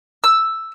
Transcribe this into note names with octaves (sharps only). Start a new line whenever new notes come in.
E6